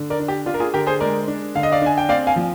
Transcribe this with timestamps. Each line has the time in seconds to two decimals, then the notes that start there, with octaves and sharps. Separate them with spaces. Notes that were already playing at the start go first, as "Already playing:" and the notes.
Already playing: D3
0.10 A#4 D5
0.20 D4
0.28 G4
0.46 D4 F4
0.54 A#4
0.60 F4 G#4
0.74 D3 G4 A#4
0.87 G#4 C5
1.00 G#3 A#4 D5
1.28 D4
1.55 D3 F5
1.63 D#5
1.72 D5 F5
1.82 D4 G#5
1.98 G5
2.09 C4 D5 F5
2.27 F5 G#5
2.36 F3